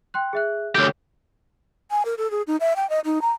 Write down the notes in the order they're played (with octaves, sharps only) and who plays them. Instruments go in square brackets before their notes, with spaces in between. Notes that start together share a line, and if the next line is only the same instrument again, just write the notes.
[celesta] G5 C6 F#6
G#4 E5 F#6
[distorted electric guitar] D2 G4 [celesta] A4 C#5
[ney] G#5
A#4
A4
G#4
D#4
E5
G5
D#5
D#4
A#5